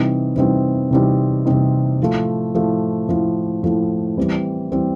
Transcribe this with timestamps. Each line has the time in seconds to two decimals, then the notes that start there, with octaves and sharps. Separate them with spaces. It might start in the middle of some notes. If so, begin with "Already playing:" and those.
Already playing: C3 E3 G3 C4 D#4
0.36 C3 E3 G3 C4 D#4
0.91 C3 E3 G3 C4 D#4
1.46 C3 E3 G3 C4 D#4
2.00 A2 F3 A3
2.54 A2 F3 A3
3.09 A2 F3 A3
3.63 A2 F3 A3
4.17 E3 G3 C4
4.71 E3 G3 C4